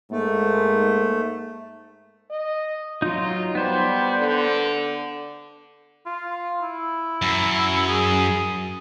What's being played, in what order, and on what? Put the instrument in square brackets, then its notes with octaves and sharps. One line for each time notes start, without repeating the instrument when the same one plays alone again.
[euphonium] G#2 [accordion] A3 [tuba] A#3
[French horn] D#5
[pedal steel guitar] F#3 D#4 [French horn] F4
[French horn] G3 [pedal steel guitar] B3 C5
[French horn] D3
[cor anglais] F4
E4
[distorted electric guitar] F#2
[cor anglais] G#4